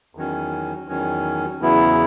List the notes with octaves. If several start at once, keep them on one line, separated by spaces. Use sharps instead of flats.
E2 D#3 F#3 C#4
E2 D#3 F#3 C#4
E2 C#3 F#3 B3 E4